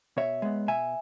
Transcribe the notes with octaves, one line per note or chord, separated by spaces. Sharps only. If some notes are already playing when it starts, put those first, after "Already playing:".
B2 C#5 E5
G#3 B3
B2 E5 G#5